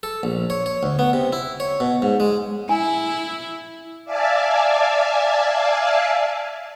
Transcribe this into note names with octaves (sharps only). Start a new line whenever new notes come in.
A4
A#1
C#5
C#5
D2
B3
C3
E4
C#5
B2
G#2
G#3
E4 G#5
D5 E5 F5 G#5 A5